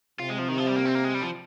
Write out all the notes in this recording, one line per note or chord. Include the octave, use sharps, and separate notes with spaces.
C3 F4
G#3
F3
D#3
F3
G3
A#3
C4
A#3
G#3
G3
F3